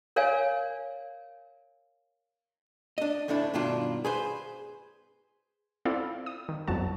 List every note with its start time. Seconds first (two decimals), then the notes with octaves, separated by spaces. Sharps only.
0.16 A#4 C#5 D5 F5 G#5
2.98 D4 D#5
3.28 D2 A2 A3 D4 E4
3.54 G2 B2 D#3 D4 F4
4.05 G#4 B4 C5
5.85 C4 E4 F4 A4 D5 F5
6.26 D#6
6.49 D#3
6.67 G1 C2 F2 F#3 A5